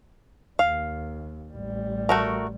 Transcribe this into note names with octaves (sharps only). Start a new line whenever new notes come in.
D#2 F5
A1 G3
A3 F#4 A#4